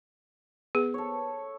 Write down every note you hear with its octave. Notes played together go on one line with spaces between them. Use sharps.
B3 G#4
A4 C#5